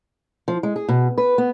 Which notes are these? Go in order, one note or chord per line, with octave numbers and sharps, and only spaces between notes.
F3
G#3
G#4
B2
B4
B3